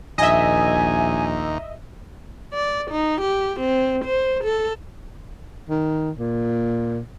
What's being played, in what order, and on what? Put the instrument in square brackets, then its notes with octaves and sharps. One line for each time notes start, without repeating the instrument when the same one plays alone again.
[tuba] A#1 [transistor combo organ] D#2 D#4 [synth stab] D#5 E5 [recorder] G#5
[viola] D5
D#4
G4
C4
C5
A4
[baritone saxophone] D#3
A#2